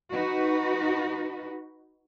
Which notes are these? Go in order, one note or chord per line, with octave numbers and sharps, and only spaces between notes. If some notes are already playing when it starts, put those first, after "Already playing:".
D#4 F#4 B4